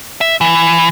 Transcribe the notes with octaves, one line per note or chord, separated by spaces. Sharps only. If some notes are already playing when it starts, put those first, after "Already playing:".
E5
E3